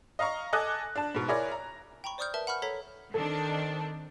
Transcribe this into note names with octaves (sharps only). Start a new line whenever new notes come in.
D#5 F5 A#5 C#6
A4 D#5 G#5 D6 F#6
D4 A5
G#2 B2
E4 G#4 A#4 C#5 D5 E5
A#5
G5 A#5 B5 C#6
C5 D5 C#6 D#6 F6 G6
A#4 B4 E5 A5
F#5 B5 C#6 F6
A4 C#5 A#5 B6
D#3 C4 D4 A4